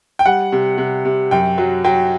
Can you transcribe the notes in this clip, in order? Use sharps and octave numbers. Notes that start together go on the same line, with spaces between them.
G5
G3 F#5
C3
C3
C3
F#2 G5
F#3
F#3 G5